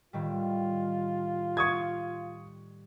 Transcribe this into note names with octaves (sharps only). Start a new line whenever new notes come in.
A2 D#3 G3 F4
C#6 D#6 G#6